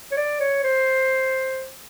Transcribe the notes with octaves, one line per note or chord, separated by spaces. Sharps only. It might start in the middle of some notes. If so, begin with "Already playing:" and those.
C#5
D5
C#5
C5